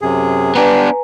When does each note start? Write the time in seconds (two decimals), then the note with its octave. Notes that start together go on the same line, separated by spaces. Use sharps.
0.01 F#2 C3 G#4
0.55 B3 D4 G4 B4 G#5 A#5